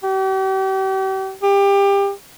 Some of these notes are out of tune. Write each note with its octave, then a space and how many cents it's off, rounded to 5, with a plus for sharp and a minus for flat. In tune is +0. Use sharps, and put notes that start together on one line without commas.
G4 -40
G4 +25